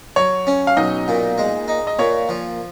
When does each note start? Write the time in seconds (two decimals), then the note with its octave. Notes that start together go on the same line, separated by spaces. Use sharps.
0.16 F#3 C#5
0.47 C#4
0.67 F5
0.77 B1 D#4 D#5
1.08 A#2
1.38 G#3
1.68 D#4
1.87 D#5
1.99 A#2 C#5
2.29 F3